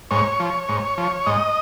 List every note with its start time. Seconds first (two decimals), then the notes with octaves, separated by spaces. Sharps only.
0.11 G#2 C#5
0.40 F3
0.69 G#2
0.98 F3
1.26 G#2 D#5